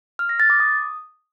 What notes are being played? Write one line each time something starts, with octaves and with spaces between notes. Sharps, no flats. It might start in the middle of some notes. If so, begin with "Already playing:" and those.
F6
A#6
A6
D6
D#6